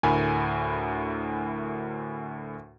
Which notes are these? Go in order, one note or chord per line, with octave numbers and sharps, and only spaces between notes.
D2 A2 A#4 G#5 B5